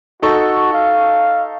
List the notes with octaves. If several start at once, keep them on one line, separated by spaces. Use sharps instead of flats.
D#4 F#4 A4 C#6
F5